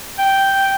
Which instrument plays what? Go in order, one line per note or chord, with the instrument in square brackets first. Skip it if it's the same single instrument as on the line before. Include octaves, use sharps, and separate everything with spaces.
[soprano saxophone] G5